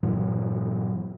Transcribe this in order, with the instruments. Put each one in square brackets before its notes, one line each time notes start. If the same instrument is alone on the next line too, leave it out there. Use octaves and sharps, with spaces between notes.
[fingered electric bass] G2 A#2 E3 F#3